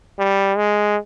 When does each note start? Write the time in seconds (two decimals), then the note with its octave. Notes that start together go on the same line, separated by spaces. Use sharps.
0.19 G3
0.57 G#3